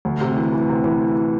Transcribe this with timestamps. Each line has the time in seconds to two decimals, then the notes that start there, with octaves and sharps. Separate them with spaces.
0.05 D2
0.21 C3
0.36 E3
0.53 E3
0.69 C3
0.84 E3